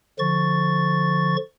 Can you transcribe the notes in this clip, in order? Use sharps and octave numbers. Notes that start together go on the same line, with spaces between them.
D3 F3 C#6 A6